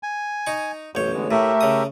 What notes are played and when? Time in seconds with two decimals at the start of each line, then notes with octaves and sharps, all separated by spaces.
0.03 G#5
0.47 D#4 C#6
0.95 A1 F#2 B2 C#5 G6
1.14 D3 G#3 B3
1.31 A2 A3 G4 A#4 E5
1.61 C#3 D#6